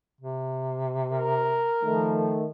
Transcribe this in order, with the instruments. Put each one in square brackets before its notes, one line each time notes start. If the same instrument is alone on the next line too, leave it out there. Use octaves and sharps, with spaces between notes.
[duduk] C3
[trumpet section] A#4
[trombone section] D#3 A3 [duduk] F3